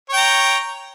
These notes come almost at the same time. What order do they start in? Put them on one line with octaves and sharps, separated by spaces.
C#5 G5 A#5